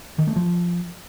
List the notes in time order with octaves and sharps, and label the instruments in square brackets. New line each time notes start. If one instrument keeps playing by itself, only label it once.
[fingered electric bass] D#3
A3
F3